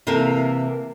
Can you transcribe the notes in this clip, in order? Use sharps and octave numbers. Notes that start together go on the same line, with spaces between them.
C3 E3 A#3 A4 A#4